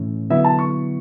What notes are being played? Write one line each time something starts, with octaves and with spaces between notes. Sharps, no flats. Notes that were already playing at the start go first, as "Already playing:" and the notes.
Already playing: A2 E3 A3 C#4
D3 F#3 B3 E4 E5
A5
C#6